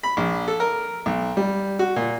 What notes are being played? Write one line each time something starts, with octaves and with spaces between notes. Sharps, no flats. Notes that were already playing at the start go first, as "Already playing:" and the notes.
B5
A#1
A4
A#4
B1
G3
F#4
A#2